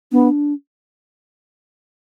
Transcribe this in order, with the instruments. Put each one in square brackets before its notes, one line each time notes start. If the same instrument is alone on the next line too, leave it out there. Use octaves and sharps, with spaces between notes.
[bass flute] B3 [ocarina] D4